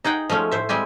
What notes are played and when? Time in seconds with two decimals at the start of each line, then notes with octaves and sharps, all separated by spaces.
0.04 D#4 G#4 F#5 G5
0.29 F3 G#3 A3 C#4
0.51 A2 C5 E5
0.69 G3 G#3 C4 G4 G#5